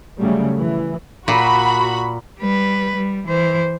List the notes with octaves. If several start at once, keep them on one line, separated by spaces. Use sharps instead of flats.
C#3 F#3 G3 A3
E3
A#2 F#4 B5
G3 B4
G3
E3 C5